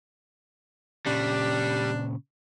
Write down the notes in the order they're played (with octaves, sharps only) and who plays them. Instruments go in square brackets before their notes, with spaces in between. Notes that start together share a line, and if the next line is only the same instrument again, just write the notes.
[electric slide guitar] A#2 C#3 C#4 [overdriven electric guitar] G3 [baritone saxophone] D4